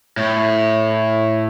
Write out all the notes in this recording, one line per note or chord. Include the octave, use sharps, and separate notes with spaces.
A2